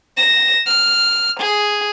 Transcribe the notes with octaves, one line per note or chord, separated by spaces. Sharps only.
A#6 E7
F6
G#4